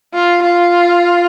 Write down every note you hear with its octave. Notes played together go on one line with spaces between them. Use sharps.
F4
F4